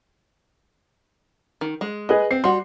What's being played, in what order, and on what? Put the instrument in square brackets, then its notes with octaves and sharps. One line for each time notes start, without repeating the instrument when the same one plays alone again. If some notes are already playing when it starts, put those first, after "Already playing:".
[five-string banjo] D#3
G#3
[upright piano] G#4 B4 D#5
[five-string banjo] C4 [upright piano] C7
[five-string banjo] G3 F#4 [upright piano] C6